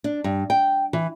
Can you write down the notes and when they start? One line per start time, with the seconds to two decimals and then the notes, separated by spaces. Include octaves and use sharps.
0.04 D4
0.24 G2
0.50 G5
0.93 E3